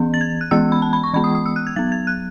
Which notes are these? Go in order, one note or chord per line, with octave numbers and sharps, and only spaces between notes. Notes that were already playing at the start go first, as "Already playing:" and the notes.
Already playing: E3 B3
A6
G#6
F#6
E3 G#3 B3 E6
B5
A5
B5
C#6
E3 G#3 B3 B5
D#6
D#6
E6
F#6
G#6
F#3 B3 A6
G#6
F#6